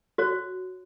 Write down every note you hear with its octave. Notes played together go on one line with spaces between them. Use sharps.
F#4 C#5